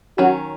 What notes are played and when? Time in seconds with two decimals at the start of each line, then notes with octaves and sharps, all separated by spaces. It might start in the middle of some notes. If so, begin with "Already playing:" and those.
0.18 D#3 F#3 C#4 F#4